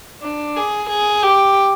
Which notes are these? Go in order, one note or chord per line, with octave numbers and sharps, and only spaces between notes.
D4
G#4
G#4
G4